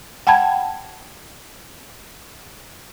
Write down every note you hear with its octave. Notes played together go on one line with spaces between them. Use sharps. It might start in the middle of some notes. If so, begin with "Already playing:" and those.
F#5 G5 A5 B5 G#6